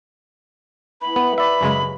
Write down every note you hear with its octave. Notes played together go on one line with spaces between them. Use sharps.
E3 B3 B5
B3 G4
D5 E5 B5
F#2 C#3 G#3